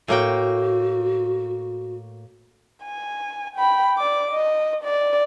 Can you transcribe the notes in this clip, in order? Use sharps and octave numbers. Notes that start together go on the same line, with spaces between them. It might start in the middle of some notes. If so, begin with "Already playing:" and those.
A2 A#3 F#4 G5
G#5
G5 B5
D5 D6
D#5
D5